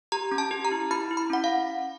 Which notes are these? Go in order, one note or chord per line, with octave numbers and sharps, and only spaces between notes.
G4 A#5
C#4
A5
G4
A#5
E4
E4 B5
E4
B5
C#4 F#5
F5